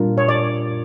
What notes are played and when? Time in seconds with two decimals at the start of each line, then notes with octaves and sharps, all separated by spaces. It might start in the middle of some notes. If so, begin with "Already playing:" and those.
Already playing: A#2 G3 D4 F4 A#4
0.18 C#5
0.29 D5